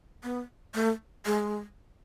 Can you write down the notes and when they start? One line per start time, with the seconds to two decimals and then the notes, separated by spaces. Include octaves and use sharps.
0.24 B3
0.74 A3
1.26 G#3